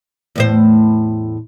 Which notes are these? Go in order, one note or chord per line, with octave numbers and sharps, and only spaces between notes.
E2 A2 C5